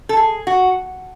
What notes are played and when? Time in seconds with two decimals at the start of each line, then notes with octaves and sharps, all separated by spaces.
0.09 A4
0.17 G#4
0.47 F#4